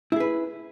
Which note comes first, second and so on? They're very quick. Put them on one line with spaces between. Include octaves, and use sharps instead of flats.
E4 G#4 B4